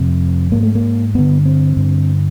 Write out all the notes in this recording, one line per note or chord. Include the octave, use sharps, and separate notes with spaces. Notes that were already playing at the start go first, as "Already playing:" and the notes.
Already playing: F2 C3
G#2 A#3
A3
A#3
G2 D3 B3
C4
G2 D3